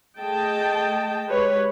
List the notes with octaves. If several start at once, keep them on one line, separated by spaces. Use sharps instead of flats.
A3 G#4 D#5 G5 A5
G#3 G4 B4 C#5